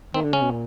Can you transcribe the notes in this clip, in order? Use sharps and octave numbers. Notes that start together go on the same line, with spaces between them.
D#3 C4
D3
C#3 C#4
B2
A#2